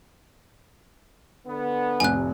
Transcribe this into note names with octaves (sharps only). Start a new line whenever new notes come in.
D3 B3
F1 A2 C3 G#5 F#6